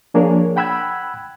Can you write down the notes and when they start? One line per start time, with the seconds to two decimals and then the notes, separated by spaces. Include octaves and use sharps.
0.14 F3 A#3 D4 G#4 A#4 C#5
0.56 F#5 G5 B5 E6 F#6 G#6